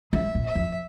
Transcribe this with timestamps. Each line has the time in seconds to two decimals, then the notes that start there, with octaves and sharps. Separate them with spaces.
0.12 G#3 E5
0.35 A#2
0.45 E5
0.55 F2